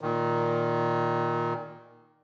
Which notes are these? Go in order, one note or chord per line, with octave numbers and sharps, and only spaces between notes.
A#2 D#3